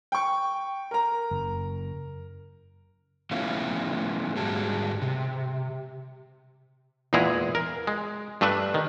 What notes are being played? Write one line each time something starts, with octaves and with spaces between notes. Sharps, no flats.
G5 C#6
A#4 A#5
F#1
F3 A3 B3 C#4 E4 F4
G#2 G3 F#4 G#4 A5
C3
E2 A#2 G#3 E4 G#4 A#5
A#4
G#3
G2 A3 D4 B4 E5
D#3